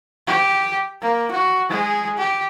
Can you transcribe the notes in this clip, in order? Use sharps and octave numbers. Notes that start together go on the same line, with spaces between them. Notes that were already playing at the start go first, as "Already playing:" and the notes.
G4
A#3
F#4
G#3 G#4
G4